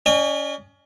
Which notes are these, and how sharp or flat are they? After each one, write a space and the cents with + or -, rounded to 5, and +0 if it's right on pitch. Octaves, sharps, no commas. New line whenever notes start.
C#4 +25 D#5 -45 G#5 -40